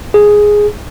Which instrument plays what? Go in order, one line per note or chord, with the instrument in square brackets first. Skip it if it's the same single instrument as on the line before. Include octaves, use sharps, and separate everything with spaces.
[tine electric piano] G#4